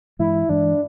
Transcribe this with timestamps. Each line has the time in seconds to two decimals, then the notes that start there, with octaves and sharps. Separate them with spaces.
0.19 G2 E3 G#3 E4
0.49 G2 E3 G#3 D4